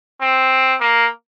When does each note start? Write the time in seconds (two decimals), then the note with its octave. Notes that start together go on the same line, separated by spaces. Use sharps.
0.21 C4
0.80 A#3